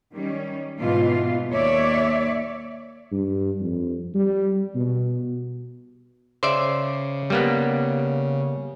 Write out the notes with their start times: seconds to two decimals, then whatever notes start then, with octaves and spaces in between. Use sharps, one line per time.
0.14 D#3 G3 C#4
0.80 G#2 B2 E3 F4
1.51 D#2 C#5 D5 E5
3.12 G2
3.60 F2
4.14 G3
4.75 B2
6.43 C#3 C5 D5 E5
7.30 G3 A#3 B3